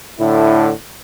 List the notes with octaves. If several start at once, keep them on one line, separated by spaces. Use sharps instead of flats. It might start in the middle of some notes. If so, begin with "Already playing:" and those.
A2 D3 E4